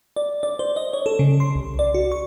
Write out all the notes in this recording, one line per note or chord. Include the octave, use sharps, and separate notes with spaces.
D5
D5
C5
D#5
C#5
A4
C#3
C6
C2
D5
F#4
C#6